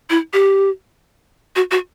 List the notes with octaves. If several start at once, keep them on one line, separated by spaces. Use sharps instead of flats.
E4
G4
F#4
F#4